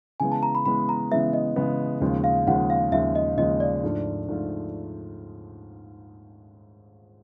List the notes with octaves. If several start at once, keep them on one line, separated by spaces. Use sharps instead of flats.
C#3 E3 G#3 B3 G#5
A5
A#5
B5
C#3 E3 G#3 B3 B5
A#5
C#3 E3 G#3 B3 E5
D#5
C#3 E3 G#3 B3
D#2 C#3 F3 G#3
F5
D#2 C#3 F3 G#3 F#5
F5
D#2 C#3 F3 G#3 E5
D#5
D#2 C#3 F3 G#3 D#5
D5
G#2 F3 A3 D4 F4
G#2 F3 A3 D4 F4